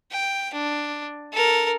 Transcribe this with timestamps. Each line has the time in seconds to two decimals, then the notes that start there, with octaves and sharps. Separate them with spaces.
0.11 G5
0.54 D4
1.33 A4 A#4